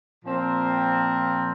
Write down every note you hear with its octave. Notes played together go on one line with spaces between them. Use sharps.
A#2 F3 C4 A#4